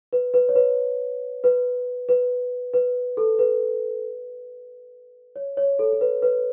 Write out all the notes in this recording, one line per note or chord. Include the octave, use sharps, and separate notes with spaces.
B4
B4
C#5
B4
B4
B4
B4
A4
B4
C#5
C#5
A4
A4
B4
B4